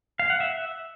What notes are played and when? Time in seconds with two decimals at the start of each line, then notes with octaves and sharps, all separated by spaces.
0.19 F5
0.30 F#5
0.40 E5